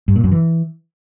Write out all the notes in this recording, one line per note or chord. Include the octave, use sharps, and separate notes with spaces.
G2
A#2
F#2
E3